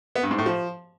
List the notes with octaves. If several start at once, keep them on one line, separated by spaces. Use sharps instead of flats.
B3
G2
G#2
A2
F3